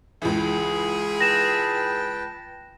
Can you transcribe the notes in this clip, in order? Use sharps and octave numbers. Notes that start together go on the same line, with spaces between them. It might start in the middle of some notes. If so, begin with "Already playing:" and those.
C#2 E3 E4 F4 G#4
B4 G5 A5 A#6 E7